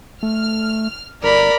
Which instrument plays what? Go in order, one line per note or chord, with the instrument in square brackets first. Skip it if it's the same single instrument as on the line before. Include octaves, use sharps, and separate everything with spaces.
[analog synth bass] A3 [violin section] F6
[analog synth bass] G1 [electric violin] A#4 B5 [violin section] D5 A#5